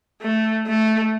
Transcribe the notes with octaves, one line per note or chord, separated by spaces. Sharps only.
A3
A3